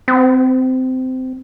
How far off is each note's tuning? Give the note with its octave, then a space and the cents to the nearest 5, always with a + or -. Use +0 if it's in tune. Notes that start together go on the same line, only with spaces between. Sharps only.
C4 -20